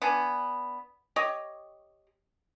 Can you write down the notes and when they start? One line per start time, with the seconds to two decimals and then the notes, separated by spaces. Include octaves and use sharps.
0.02 B3 D4 G#5
1.16 G4 C#5 D#5